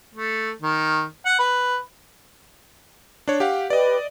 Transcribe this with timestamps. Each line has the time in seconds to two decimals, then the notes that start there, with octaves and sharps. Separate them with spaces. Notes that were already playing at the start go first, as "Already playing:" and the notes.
0.15 A3
0.62 D#3
1.25 F#5
1.39 B4
3.28 D4 C#5
3.40 G4 F5 F#5
3.70 G4 B4 D5 D#5